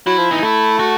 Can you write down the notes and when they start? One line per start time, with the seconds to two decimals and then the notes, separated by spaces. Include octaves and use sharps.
0.06 F#3 E4
0.18 F3
0.31 E3 D#4
0.43 A3 E4
0.79 F#4